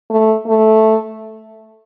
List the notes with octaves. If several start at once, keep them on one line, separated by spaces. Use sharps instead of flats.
A3
A3